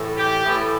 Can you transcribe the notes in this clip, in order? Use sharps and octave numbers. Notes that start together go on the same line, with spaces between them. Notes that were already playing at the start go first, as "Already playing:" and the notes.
Already playing: A2 E3
G4
A2 E3